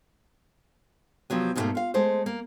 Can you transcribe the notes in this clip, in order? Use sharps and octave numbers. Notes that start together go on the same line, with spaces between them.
C3 F3 F#3 B3
G#2 B2 E3 G3 A3 A#3
F4 F5
G#3 A3 C5
A#3